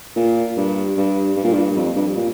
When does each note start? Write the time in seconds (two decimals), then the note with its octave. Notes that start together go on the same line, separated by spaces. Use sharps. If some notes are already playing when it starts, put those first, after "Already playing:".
0.16 A#2
0.57 G2
0.97 G2
1.36 G2
1.44 A#2
1.53 G2
1.76 F2
1.96 G2
2.16 A#2